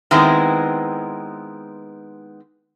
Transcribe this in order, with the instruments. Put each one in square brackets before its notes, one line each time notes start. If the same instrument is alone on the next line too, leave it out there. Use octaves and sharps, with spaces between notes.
[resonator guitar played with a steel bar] D#3 G#3 B3 C4 E4